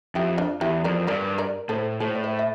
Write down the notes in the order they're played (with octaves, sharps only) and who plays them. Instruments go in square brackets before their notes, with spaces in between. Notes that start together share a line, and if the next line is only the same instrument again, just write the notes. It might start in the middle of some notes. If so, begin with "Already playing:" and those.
[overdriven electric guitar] F2 [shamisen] E4 G4
[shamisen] D4 F4
[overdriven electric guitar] E2 [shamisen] E4 G4
[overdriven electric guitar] F2 [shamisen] A#4 D5
[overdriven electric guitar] G2 [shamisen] A#4 D5
[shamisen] A#4 D5
[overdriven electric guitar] A2 [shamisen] A4 C5
[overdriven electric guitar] A2 [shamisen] A4 C5
[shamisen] D5
C5 E5
E5